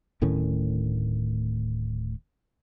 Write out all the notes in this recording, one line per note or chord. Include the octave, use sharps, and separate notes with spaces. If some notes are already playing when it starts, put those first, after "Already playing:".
D1 A2 D#3 C#4